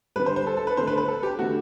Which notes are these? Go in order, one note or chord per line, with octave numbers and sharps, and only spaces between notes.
D3 G3 B4
C5
C5
A4
A4
B4
D3 A3 C5
B4
B4
A4
G4
D3 A3 F#4